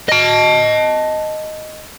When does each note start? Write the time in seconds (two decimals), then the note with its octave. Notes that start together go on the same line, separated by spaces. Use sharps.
0.09 D#5 A5